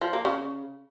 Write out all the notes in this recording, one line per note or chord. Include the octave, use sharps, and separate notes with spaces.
F3
A#3
C#3